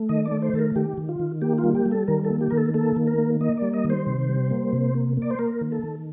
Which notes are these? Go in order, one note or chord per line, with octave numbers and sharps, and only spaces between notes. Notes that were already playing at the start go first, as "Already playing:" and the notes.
Already playing: A3
D#3 D#5
D5
A3
C5
D#3 A4
A#4
D#3 G4
D#3
F4
D#3
A#3 G4
F4
G3
G4
G3
A4
D#3 A#4
A4
A#3
G4
D#3 A#4
A4
A#3 A4
D#3
A#4
A#3
A#3 D#5
G3 D5
D#5
D#3
C5
C3
G3
A#3
C3
A#3
A#3 D5
C5
A#3 A#4
D#3
A4
D#3